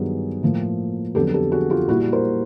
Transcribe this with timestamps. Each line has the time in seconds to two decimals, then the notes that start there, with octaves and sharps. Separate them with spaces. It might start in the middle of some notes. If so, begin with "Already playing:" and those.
Already playing: G2 D#3 F#3 B3 G#4
0.43 A2 F3 A#3
1.15 F2 D3 F#3 B3 G4 A4
1.34 G4 A4
1.52 F#4 G#4
1.70 F4 G4
1.89 A#2 G3 A#3 E4 F#4
2.12 A#4 C5